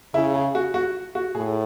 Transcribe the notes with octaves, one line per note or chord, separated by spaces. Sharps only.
C#3 E4
G#4
F#4
F#4
F#4
A2 G#4